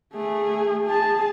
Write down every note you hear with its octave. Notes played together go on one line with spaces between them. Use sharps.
A3 G#4
G#4 A5